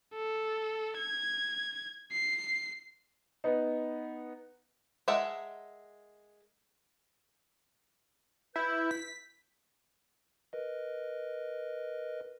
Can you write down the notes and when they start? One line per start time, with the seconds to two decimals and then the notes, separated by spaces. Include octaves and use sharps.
0.14 A4
0.97 G#6
2.12 C7
3.44 B3 D#4
5.08 G#3 A#4 E5 F#5 A5
8.56 E4 B4 G6
8.91 B6
10.53 A#4 B4 D#5